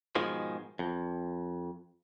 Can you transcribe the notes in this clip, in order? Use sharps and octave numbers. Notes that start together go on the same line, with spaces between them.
G#2 B2 D#3 F3 G#3
F2